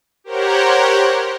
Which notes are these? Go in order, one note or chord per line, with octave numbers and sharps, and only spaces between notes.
G4 A#4 C5 C#5 F#5